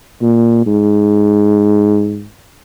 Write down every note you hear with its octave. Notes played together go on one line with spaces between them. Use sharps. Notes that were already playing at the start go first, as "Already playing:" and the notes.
A#2
G#2